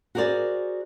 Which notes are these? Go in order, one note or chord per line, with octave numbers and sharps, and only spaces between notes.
F#4 G#4 A#4 C5 D5